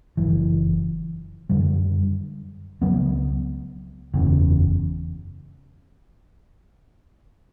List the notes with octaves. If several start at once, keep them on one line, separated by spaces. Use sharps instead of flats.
F#1 F#2 E3
F#2 D3 G3
C#2 C#3 F#3 B3
F#1 E2 C#3